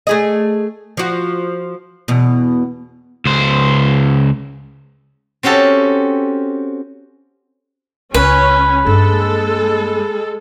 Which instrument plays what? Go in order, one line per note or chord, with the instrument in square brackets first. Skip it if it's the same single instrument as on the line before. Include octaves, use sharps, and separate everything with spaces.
[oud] A3 G#4 D#5
F3 F#4
E2 B2
[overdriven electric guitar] C#2 C5
[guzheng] C4 C#4 F#4 G4 A4
[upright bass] C#2 [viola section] C#4 [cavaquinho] B4
[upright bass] G2 A#3 [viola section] G#3 A4